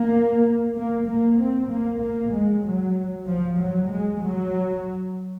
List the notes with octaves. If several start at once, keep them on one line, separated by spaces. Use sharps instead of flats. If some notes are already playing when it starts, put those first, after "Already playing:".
Already playing: A#3
A#3
A#3
C4
A#3
A#3
G#3
F#3
F3
F#3
G#3
F#3